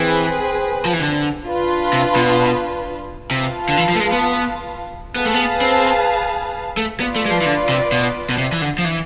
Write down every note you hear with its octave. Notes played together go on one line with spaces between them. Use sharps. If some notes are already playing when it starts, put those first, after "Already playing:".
Already playing: E3 C4 G#4 B4
F3
E3
D3
D4 F4 B4
C3
B2
C3 F4 B4 F5 A5
D3
E3
F3
A3
G#3
B3
B3 G#4 B4 F5 A5
A3
B3
C4
A3
B3 F4 B4 D5
A3
G#3
F3
E3
D3
C3
B2
B2
C3
E3
D3
F3
E3